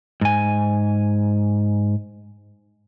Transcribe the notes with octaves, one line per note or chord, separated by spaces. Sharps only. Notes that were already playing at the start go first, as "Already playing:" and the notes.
G#2 G#5